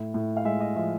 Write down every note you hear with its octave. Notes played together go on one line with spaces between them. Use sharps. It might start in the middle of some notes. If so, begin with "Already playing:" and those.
Already playing: A2
A2
F5
G#3 E5
D#5
F3 E5